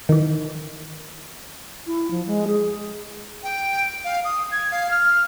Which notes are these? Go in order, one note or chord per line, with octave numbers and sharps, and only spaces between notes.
D#3 E3
E4
F3
G#3
G#4
G5
F5
D#6
G#6
F5
F6